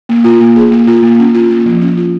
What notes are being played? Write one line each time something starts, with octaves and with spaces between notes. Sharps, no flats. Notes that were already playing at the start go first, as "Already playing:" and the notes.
A#3
F4
A#3
G#4
A#3
F4
A#3
C#4
F4
A#3
F3
C#4
F4